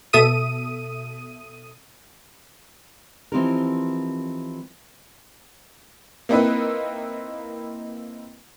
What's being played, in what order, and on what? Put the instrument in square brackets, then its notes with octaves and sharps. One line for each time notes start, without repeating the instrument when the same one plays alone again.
[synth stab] B2 A4 E5 D#6 D#7
[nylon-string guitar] E3 F3 C4 D#4 G4 A#4
[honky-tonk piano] A#3 C4 D#4 E4 A#4 B4